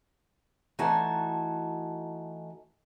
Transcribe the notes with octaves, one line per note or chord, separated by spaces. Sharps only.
E3 A3 D#4 F#4 G#5 A5